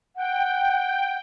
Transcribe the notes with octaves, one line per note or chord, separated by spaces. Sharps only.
F#5 G5